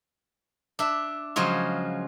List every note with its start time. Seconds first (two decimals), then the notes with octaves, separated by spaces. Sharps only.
0.79 D4 E5
1.36 C#3 F3 F#3 G#3 F4